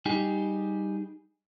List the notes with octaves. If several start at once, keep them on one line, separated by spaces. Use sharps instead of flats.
G3 D#4 G4 G#4